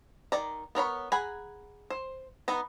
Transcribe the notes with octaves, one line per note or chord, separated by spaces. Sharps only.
D#3 D5 A#5
B3 A#4 C#5 B5
G#4 F#5 G#5 A#5 B5
C5
B3 D#4 B4 A#5